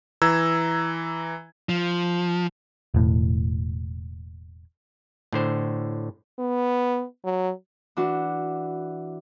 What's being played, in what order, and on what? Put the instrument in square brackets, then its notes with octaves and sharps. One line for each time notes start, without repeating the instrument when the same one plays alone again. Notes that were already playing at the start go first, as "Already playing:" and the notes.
[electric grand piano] E3 A#5 E6 G#6
[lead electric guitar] F3
[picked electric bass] E1 A2
[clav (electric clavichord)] A2 D3 C5
[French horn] B3
F#3
[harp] E3 D4 F#4